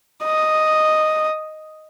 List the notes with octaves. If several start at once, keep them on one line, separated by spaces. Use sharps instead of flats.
D#5